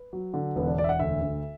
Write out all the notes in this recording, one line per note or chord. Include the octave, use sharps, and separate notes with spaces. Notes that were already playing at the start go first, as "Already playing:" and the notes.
Already playing: B4
F#3
D3
E1 B3
D4
E1 D5
E5
F#5
D2 E5
D2